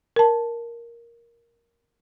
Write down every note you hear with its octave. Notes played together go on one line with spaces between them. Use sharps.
A#4 A5